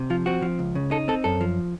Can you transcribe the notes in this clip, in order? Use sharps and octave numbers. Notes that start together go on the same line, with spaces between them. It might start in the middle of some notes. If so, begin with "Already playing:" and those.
Already playing: C3
F3 F4
C4 F#4
F3
C#2
C#3
D#4 A4
C4 A4
F#2 A4
F3